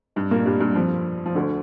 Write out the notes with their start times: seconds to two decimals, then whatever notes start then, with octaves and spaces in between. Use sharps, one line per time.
0.16 G2 G3
0.31 A#2 A#3
0.46 G2 G3
0.60 G2 G3
0.75 F2 F3
1.26 F3
1.35 D2 D3